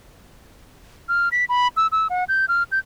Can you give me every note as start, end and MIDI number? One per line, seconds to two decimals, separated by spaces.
1.09 1.29 89
1.32 1.45 95
1.49 1.68 83
1.77 1.87 88
1.92 2.08 88
2.10 2.24 78
2.28 2.45 91
2.48 2.63 89
2.72 2.79 91